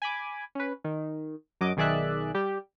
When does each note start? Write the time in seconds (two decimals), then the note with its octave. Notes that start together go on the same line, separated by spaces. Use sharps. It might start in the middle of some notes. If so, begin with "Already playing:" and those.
0.02 G#5 B5 D6
0.55 C#4 B4
0.84 D#3
1.61 F#2 F#3 D#5 D6
1.77 B1 D#3 G#4 D5 E5 F#6
2.34 G3 G4